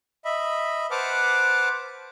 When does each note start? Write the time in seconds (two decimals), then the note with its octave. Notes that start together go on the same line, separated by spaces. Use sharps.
0.25 D#5 E5 B5
0.91 B4 C5 F#5 A5 D6 F6